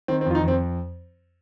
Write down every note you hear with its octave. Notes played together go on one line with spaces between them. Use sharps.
D#3 C4
C4
F2 F4
D#4
F2 C4